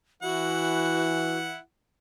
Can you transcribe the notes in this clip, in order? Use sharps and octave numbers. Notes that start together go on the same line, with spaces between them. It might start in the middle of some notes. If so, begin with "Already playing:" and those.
E3 E4 F#4 F#5